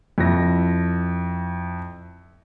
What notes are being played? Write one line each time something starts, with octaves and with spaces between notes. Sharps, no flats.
F2 E4 A#6